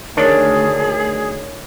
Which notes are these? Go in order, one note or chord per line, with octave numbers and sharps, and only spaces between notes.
D2 D#3 D4 G#4 A#4 C#5 A6